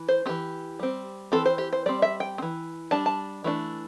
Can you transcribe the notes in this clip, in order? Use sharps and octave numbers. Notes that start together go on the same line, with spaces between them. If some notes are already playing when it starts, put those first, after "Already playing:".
Already playing: E3
C5
E3 C4 G4
G3 C4
E3 C4 A4
C5
G4
C5
G3 C4 D5
E5
G5
C4
E3
G3 D4 A5
A5
E3 A3 D4